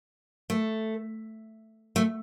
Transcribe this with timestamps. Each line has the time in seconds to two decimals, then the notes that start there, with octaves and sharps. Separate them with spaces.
0.50 A3
1.96 A3